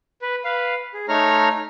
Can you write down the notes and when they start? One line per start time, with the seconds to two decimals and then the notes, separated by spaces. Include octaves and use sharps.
0.22 B4
0.44 B4 F5
0.94 G#4
1.08 A3 D#4 C#5 A#5 F6